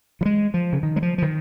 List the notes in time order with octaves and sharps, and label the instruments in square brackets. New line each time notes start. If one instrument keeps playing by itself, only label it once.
[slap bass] F3
G#3
F3
C#3
D#3
G#3
F3
F3
D#3